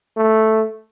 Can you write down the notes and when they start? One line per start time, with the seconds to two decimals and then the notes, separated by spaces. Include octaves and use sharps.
0.17 A3